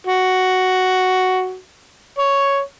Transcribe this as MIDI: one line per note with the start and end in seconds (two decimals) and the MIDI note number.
0.07 1.56 66
2.18 2.59 73